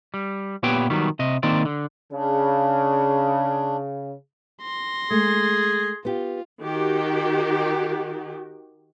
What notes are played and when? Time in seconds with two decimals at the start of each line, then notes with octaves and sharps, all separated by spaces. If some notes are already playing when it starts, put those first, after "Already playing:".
0.14 G3
0.63 A#2 B3 G4 B4 C#5 G5
0.90 D#3 F#3 G3 B3
1.19 C3 D#5
1.43 D#3 A#3 C4 D5
1.65 D3
2.13 C#3 D4
4.62 C6 A#6
5.11 G#3 A3 G#4
6.05 B3 F4 G4
6.62 D#3 F#4 G4